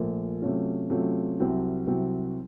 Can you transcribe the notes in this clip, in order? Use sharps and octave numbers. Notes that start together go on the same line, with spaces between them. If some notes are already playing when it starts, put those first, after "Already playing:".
Already playing: A#1 A#2 A3
C3 F#3 A3 C#4 F4
C3 F#3 A3 C#4 F4
C2 C3 F#3 C4 F#4
C2 C3 F#3 C4 F#4